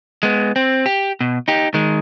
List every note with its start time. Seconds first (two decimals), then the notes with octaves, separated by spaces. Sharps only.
0.23 G#3 B3
0.56 C4
0.86 G4
1.21 B2
1.48 D#4 G4
1.74 D#3 G#3